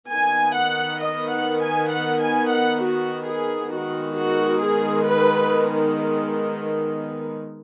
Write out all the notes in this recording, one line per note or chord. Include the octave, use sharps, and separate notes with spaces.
D#3 B3 G#5
F#5
D#5
F#5
G#5
F#5
G#5
F#5
F#4
G#4
D#3 G#3 B3 F#4
F#4
G#4
B4